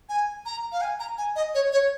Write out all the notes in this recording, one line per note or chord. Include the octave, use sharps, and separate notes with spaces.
G#5
A#5
F5
G#5
A#5
G#5
D#5
C#5
C#5